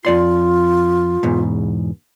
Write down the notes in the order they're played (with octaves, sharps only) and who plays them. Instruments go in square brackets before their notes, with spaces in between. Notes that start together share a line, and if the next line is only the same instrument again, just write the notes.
[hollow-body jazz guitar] F2 D5 C6 [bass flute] F4
[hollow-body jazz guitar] E2 G#2 B2